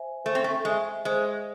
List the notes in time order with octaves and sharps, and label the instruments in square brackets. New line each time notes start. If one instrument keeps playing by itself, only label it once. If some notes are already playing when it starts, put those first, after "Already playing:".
Already playing: [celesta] C5 E5 G#5
[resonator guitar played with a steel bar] A3 [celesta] C5
[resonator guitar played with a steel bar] C4
A3
[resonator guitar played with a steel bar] G#3 [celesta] E5 G#5
[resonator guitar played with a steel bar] G#3 [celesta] C5